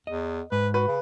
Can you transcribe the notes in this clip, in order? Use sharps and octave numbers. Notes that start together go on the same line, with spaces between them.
E2 D#5
G#2 B4
F#4 B4
C#3